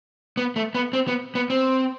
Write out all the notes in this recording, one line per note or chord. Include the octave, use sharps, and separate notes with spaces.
B3
A3
B3
C4
B3
B3
C4